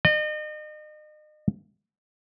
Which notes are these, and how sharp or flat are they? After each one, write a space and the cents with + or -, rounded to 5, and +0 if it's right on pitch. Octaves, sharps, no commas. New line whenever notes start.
D#5 -40